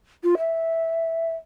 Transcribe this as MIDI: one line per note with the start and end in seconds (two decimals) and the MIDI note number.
0.24 0.35 65
0.38 1.34 76